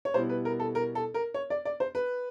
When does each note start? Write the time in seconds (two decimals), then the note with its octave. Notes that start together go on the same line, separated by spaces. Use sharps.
0.05 C#5
0.14 B2 G3 B3 E4 C5
0.29 B4
0.45 A#4
0.60 A4
0.75 A#4
0.95 A4
1.14 A#4
1.34 C#5
1.50 D5
1.65 D5
1.80 C5
1.95 B4